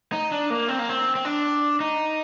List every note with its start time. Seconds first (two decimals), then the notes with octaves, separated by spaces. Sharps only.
0.12 D#4
0.31 D4
0.50 A#3
0.68 C4
0.79 A#3
0.89 C4
1.15 C4
1.25 D4
1.80 D#4